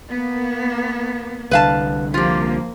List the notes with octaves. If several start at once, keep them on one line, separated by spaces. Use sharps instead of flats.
A#3 B3
C2 D3 B4 F5 A5
F3 A#3 F4 G4